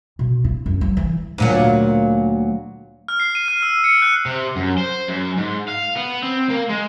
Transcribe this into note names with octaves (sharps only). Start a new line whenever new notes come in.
B2
E4
F#2
F#3
E3
D2 A#2 F#3
F6
C7
D#7
F6
E6
C#7
F#6
C3
F#2
C5
F#2
G#2
F5
B3
C4
A#3
G#3